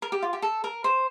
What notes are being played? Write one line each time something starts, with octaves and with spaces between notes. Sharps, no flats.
A#4
G4
F4
G4
A4
A#4
C5